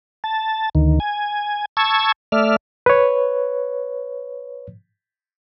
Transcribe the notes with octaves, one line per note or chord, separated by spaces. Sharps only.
A5
D2 D#3
G#5
A5 C#6 E6 G#6
A3 D5 E5 F6
B4 C#5